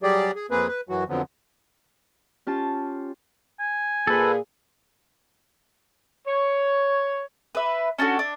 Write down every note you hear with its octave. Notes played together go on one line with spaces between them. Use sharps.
F#3 G3 G4 G#4 D5
G#4
F2 A#3 C4 G#4 B4
B4
F#2 E3 F#3 F#4
F2 D3 F3 F#3 B3
C#4 F4 G4 C#5 A5
G#5
A#2 A#3 G#4 A4 B4
C#5
B4 E5
C#4 D4 F#4 A4
D4